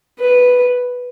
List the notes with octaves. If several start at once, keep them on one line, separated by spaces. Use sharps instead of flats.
B4